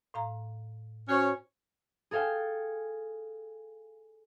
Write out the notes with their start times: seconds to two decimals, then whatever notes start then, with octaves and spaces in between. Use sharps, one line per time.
0.14 A2 F5 A#5
1.09 C#4 F#4 C5 C#5
2.11 G#4 A4 F5 G5 G#5